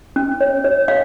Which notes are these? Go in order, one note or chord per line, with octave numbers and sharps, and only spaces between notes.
C#4
C#5
C#5
F5